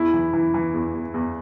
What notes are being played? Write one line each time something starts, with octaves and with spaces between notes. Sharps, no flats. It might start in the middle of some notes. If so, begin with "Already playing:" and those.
Already playing: E2 E4
E3
E3
E3
E2
E2
E2